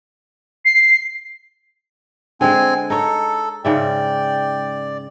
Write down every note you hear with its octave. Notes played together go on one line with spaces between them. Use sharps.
C7
D3 G#3 C4 G#5
D#4 A4 C#5
G#2 C#3 D5 E5 G5